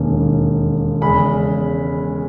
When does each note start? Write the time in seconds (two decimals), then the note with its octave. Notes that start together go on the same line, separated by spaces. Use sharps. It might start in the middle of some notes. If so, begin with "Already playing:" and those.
Already playing: E1 D#2 D#3 A#3 C#4
1.01 E2 C#3 G#3 C#4 B5